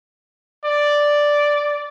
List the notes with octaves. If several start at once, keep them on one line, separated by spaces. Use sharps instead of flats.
D5